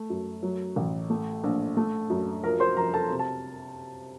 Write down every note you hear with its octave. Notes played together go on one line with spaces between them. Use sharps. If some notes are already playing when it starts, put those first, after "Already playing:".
Already playing: A3
F#2
F#3
A1
A3
A#1
A3
F#2
F3 A#4 A#5
C5 C6
F2 A#4 A#5
A4 A5
C3
A5